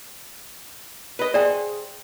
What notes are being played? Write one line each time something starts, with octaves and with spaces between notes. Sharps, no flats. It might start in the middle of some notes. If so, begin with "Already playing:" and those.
B4 D#5
G#4 C5 D5 E5 G5